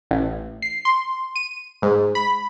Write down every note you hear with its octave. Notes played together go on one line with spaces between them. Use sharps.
A1
C7
C6
D#7
G#2
B5